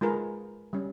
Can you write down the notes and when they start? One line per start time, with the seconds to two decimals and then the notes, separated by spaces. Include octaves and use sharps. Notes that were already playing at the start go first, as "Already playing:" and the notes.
0.01 G#3 F4 G#4 A#4 B4
0.73 G3 C#4